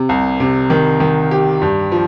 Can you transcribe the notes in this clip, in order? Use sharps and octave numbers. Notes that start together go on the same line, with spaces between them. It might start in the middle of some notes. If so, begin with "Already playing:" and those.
Already playing: C3
C2
C3
D#3
D#3
G4
G2
F3